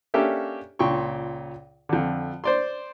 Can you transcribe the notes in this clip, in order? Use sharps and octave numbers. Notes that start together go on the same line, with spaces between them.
A#3 C#4 D4 G4 A4 E5
C#2 A#2 G5 C6 C#6
F2 D3
C5 D5 C6